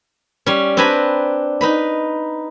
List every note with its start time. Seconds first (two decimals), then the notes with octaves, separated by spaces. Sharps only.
0.46 G3 C#4
0.77 C4 D4 B4 G#5 A#5 B5
1.61 D#4 B4 B5